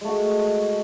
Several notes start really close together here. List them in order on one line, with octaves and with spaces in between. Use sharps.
G#3 A3 F#4